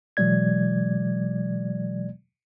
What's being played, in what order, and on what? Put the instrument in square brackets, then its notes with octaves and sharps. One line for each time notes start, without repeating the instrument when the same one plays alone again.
[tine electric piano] B2 E3 F#3 G#3 D5 G#6